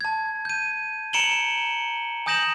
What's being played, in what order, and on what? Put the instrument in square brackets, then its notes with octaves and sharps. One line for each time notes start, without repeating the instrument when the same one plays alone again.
[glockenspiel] A5 G#6
G6 D#7
A#5 C#7 D7 E7 F#7 G7
G#5 D#6 G6 A#6 E7 F#7